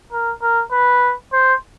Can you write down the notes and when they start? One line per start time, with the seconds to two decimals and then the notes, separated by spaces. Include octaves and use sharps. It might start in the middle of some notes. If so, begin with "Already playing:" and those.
0.12 A#4
0.42 A#4
0.72 B4
1.33 C5